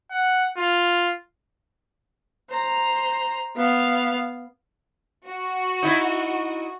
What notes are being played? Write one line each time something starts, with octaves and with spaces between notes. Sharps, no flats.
F#5
F4
C5 A#5
B3 F5
F#4
D#4 E4